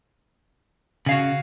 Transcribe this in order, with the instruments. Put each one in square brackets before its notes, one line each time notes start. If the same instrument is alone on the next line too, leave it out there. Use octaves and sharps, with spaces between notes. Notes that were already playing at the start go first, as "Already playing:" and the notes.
[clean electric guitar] C#3 [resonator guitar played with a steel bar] F#4 F5 G#5